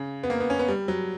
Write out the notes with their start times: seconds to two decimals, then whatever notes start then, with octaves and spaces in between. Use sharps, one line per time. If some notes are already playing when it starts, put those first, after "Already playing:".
Already playing: C#3
0.23 B3
0.30 A#3
0.40 B3
0.50 C#4
0.59 B3
0.68 G3
0.88 F#3